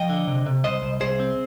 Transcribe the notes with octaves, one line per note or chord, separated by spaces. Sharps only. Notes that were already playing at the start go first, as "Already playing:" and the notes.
Already playing: F3 D#5 G5
D3
C3
C3
C2 C5 D#5
C2
C2 G#4 C5
C4